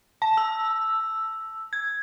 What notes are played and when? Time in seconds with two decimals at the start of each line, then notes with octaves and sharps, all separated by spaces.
0.22 A5
0.37 E6
1.73 G#6